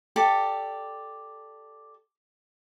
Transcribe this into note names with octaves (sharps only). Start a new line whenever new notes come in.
G4 A4 D5